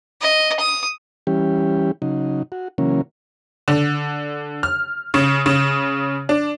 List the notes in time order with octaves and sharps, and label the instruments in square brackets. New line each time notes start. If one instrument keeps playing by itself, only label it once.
[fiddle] D#5
D#6
[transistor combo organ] E3 G3 C#4 G4
C#3 F#3 D#4
F#4
C#3 E3 F#3 A#3 C#4
[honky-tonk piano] D3
F6
C#3
C#3
D4